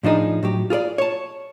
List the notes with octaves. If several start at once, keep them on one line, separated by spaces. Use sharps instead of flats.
A2 F3 D4 D#4 G#4
A2 F#3 G4
F4 G#4 A#4 D5
C#5 A5